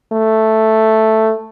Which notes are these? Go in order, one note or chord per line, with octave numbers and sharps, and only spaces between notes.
A3